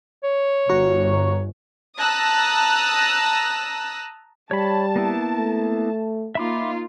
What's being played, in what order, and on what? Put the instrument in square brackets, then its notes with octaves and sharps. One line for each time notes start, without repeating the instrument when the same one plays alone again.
[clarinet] C#5
[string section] G1 [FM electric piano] F#4 A#5 C#6
[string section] A5 A#5 D#6 E6 F#6 A#6
[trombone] G3 [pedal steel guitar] C#5 B5 [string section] A5
[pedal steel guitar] A#3 B3 E4
[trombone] A3
[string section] A#3 D#4 F4 [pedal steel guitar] E5 B5 D6